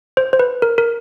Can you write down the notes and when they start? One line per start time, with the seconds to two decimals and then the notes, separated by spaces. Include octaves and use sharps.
0.17 C5
0.33 C5
0.39 B4
0.62 A#4
0.78 A#4